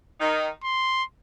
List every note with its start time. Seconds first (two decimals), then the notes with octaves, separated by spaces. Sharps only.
0.20 D#3 D#4
0.64 C6